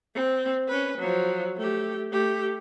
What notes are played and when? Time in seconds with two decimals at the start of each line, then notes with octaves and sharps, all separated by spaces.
0.15 C4
0.68 C#4 B4
0.98 F3 F#3
1.57 A3 G4
2.11 A3 G4